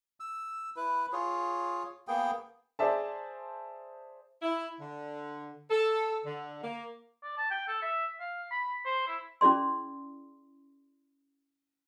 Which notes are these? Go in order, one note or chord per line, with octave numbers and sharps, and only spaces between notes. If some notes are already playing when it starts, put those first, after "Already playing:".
E6
E4 B4
F4 G#4 C#5
A#3 B3 G#4 G5
G#4 C5 D5 E5 A5
E4
D3
A4
D3
A#3
D5
A5
G5
A4
E5
F5
B5
C5
E4
C#4 E4 G#4 D5 C6